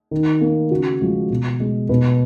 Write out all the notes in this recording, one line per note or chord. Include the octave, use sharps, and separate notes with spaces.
D#3
A#3
C#3 F#4
F3 G#3
B2
G#3
B2 B4